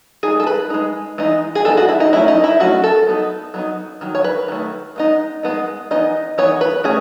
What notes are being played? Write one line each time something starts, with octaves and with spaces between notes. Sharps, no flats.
G#3 D#4 G#4
A4
B4
G#3 D#4
E3 G#3 B3 D#4
G#4
E3 G#3 B3 D#4 A4
F#4
E4
D#4
F#3 A3 C#4 E4
D#4
E4
F#3 A3 C#4 F#4
A4
F#3 B3 D#4
F#3 B3 D#4
D#3 F#3
C#5
B4
D#3 F#3 A3
G#3 B3 D#4
G#3 B3 D#4
E3 B3 D#4 D#5
E3 B3 D#4 C#5
B4
A3 C#4 G#4